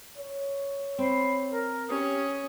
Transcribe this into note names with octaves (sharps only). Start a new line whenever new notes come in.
C#5
C4 B5 C6
A#4
C#4 G4 D#6